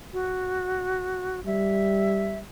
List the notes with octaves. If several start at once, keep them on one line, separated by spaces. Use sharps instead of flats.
F#4
G3 E5